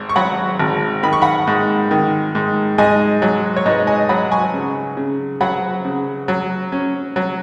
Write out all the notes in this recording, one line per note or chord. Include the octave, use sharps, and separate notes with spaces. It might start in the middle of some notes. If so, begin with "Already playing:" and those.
Already playing: G#1
C#6
F#3 F#5 B5
G#1
D#3 B5
C#6
F#5 B5
G#2
D#3
G#2
G#2 D#5 G#5
F#3
C#5
G#2 B4 D#5
D#5 G#5
F#3 F#5 B5
G#5 C#6
C#3
C#3
F#3 F#5 B5
C#3
F#3
C#4
F#3